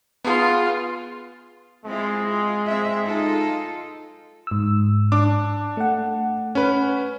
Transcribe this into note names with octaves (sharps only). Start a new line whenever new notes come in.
B3 F4 G#4
G#3 C4 E4 F4
F4
C4 E5
D#4 F4 A4
G#2 E6
D4 D6
A3 F#5
C#4 B4